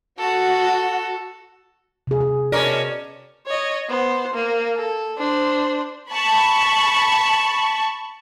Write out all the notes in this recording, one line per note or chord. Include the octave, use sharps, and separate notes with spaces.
F#4 A4
C3 G#4
G#4
B2 C#4 A#4 D5
C#5 D#5
B3 C5
A#3
A4
D4 C5
A5 B5 C#6